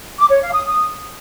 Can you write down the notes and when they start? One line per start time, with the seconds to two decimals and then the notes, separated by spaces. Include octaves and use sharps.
0.19 D6
0.30 C#5
0.42 F5
0.54 D#6
0.65 D#6